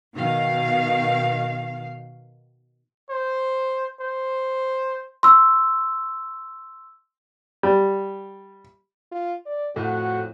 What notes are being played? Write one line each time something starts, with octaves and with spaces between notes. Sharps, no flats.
B2 D#3 F5
C5
C5
C6 E6
G3
F4
D5
F2 A2 A3 F#4 F#5